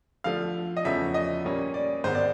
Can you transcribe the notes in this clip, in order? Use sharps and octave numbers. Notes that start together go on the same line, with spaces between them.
D3 F3 A3 F5
D#5
E2 C#3 F3 A3 C#4 E5
D#5
A#2 G3 A#3 C#4
D5
G#2 D#3 G#3 B3 C5
D5